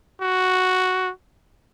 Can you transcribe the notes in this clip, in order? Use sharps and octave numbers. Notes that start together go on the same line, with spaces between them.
F#4